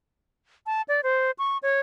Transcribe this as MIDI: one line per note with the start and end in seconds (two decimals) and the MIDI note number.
0.66 0.82 81
0.88 1.01 74
1.03 1.31 72
1.39 1.58 85
1.63 1.80 73